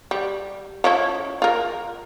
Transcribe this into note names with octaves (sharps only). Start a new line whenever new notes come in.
G3
F3 C#4 E4
F4 A#4